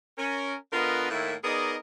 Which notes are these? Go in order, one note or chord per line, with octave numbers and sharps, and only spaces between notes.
C#4 A#4
D3 B3 F4 A#4 B4 D#5
A2 D#3 A#3 E4
B3 D#4 G#4 A#4 D5 D#5